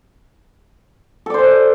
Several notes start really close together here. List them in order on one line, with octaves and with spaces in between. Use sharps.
A4 D5 C5